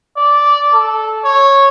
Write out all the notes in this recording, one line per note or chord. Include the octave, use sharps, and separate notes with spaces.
D5
A4
C#5